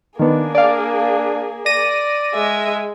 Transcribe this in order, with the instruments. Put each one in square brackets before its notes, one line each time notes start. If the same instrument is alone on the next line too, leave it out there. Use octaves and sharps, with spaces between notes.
[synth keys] D#3 B3 [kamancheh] A#3 G#4 [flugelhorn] D4
[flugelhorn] D4 [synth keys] D5 F5
[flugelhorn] D5 [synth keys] A#6 D#7
[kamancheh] G#3 E5